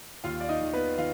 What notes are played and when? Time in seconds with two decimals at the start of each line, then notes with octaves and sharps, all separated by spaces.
0.24 D#2 F4 F5
0.41 D5
0.49 D#4 D#5
0.61 D#3
0.73 B3 B4
0.98 D#3 F4 F5